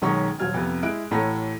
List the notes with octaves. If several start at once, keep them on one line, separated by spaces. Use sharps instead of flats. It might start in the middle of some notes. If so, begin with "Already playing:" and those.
B1 D#3 G#3 C#4 A#5 C#6
D#1 F#3 F6 G#6
F2 C3 B3
G#3 E4 E5 F#6 D7
A1 A2 A4 C#5 A#5